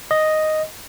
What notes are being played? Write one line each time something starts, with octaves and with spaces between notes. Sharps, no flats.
D#5